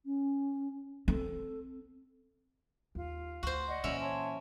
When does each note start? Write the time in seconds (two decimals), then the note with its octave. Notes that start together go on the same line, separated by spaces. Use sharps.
0.05 C#4
1.08 C4 A4
2.95 D#2 F4
3.43 D2 F#4 C5
3.67 D5 D#5 F#5
3.84 A#2 E3 C#4 E4
4.00 C#5 A5 C6